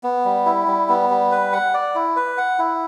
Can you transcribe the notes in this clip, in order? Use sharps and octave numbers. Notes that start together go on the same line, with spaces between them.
B3
G3
E4
G3
B3
G3
B4
F#5
D5
E4
B4
F#5
E4